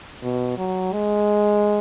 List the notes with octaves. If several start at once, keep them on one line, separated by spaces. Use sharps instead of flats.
B2
F#3
G#3